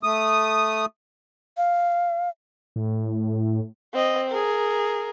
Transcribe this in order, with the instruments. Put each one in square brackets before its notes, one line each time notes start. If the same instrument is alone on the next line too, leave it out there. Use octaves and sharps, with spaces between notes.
[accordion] A3 D#6
[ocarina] F5
[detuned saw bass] A2
[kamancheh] C4 D#5
G#4 A#4